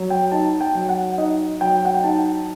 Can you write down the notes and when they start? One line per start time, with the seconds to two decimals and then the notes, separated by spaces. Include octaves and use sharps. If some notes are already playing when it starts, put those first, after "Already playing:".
Already playing: F#3
0.10 G5
0.32 D#4 A5
0.61 G5
0.75 F#3
0.89 F#5
1.18 D#4 D#5
1.61 F#3 G5
1.85 F#5
1.94 G5
2.04 D#4 A5